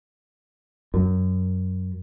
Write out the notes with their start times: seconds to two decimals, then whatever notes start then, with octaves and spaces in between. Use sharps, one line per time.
0.94 F#2